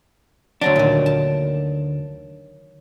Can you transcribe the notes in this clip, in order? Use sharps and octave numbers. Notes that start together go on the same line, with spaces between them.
D2 F#3 D4 A#5
A#2 D#3
A5